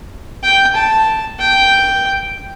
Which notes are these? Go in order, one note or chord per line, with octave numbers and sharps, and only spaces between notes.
G5
A5
G5